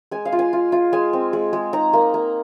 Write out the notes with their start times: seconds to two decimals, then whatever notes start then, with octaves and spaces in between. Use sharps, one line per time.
0.11 G#3 G#5
0.25 F5
0.32 F4
0.39 G#5
0.53 F4
0.72 F4
0.93 G#3 G#5
1.13 C4
1.33 G#3
1.53 G#3
1.73 D#4 A#5
1.93 A#3
2.14 A#3